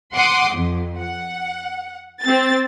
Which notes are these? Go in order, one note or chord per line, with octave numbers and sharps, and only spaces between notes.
F#5 C6 D6 D#6
F2
F#5
C4 A6